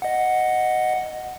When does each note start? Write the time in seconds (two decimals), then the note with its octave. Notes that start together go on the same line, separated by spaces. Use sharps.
0.02 D#5 F#5